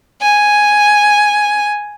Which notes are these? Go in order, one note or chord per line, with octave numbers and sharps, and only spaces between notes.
G#5